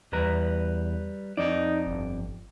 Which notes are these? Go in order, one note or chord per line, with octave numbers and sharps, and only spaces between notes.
E2 G3 B4 A#5
F2 D#4 D5
G1